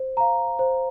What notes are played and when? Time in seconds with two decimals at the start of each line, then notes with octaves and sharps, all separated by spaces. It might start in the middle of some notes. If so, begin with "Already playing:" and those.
Already playing: C5
0.17 F5 A#5
0.59 C5